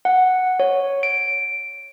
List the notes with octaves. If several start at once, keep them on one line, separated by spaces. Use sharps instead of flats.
F#5
C#5
D7